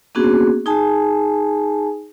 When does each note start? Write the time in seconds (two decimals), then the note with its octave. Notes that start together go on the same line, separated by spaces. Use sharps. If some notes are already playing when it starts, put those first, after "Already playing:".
0.15 A#3 B3 C#4 D4 F#4 G#4
0.66 D#4 G#4 G#5 A5